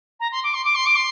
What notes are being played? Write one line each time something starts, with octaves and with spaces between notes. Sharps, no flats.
A#5
C6
D6
C6
D6
C6
D6
C6